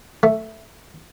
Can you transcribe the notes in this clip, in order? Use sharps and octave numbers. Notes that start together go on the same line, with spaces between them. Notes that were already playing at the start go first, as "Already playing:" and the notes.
A3